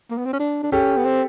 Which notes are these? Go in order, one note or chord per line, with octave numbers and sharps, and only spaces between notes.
A#3
B3
C4
C#4
D4
D4
C#4 G4 A4
B3
C4